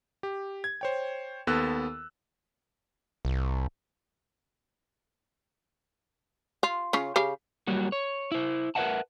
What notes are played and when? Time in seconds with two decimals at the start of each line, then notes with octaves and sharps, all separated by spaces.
0.23 G4
0.64 G#6
0.81 C5 C#5 G5
1.47 D#2 B3 A4 E6 F#6
3.25 C2
6.63 F4
6.93 C#3 C#4 F4
7.16 C#3 G4 F5
7.67 F#3 G3 A#3 F#4
7.92 C#5
8.32 E4 C5
8.75 A#4 B4 D#5 E5 F#5 A5